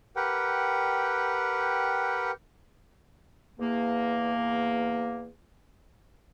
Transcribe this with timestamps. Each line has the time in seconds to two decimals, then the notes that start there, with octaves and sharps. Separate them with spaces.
0.16 G4 A#4 B4 F#5 G5
3.60 E2 A#3